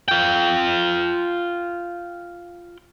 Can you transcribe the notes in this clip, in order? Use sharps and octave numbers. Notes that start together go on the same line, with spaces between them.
F4 G5